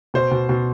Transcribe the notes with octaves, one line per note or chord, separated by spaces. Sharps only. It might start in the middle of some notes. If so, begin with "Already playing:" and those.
B2 C5
B2
B2